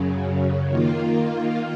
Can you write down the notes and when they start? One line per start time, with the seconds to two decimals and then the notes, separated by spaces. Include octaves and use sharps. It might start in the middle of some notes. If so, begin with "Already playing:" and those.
Already playing: F#2 C#3 F#3
0.69 D#3 A#3 F4